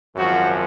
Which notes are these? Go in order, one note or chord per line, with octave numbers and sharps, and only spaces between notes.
G#1 F#2 F3 F#4